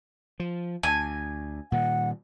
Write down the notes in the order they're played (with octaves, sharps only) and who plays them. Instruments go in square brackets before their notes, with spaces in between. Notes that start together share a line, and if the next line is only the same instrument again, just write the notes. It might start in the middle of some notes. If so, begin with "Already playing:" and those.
[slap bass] F3
[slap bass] D2 [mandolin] G#5
[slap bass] A#2 D#3 G3 [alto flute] F#5